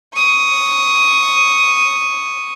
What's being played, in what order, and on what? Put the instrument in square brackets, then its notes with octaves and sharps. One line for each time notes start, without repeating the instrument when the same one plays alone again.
[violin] C#6 D#6